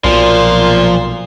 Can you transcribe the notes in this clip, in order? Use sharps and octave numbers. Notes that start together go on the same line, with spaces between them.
B1 A#2 F3 C6